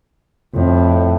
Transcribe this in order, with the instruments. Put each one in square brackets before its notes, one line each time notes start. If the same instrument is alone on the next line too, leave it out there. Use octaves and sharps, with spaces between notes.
[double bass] F2 [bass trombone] A2